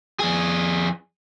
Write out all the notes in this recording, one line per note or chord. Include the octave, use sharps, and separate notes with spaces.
F2 G#4